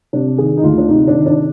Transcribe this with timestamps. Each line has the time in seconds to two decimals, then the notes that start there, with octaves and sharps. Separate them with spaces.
0.13 C3 D4
0.38 D#3 G#4
0.57 D#4
0.63 D2 F4
0.78 D4
0.89 C3 D#4
1.08 D4
1.14 D#3
1.26 D4